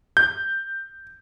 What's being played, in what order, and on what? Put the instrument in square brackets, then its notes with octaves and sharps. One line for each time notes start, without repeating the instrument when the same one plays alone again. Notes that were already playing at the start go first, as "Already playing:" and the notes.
[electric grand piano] G6